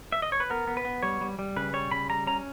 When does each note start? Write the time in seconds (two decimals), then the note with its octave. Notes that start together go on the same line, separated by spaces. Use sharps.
0.12 E5
0.22 D#5
0.32 C#5
0.40 B4
0.50 B3 A#4
0.67 B3
0.77 B4
0.85 B3
1.03 G3 C#5
1.21 G3
1.39 G3
1.56 C#3 B4
1.73 G3 C#5
1.91 C#3 B5
2.09 G3 A#5
2.27 C#4 A#5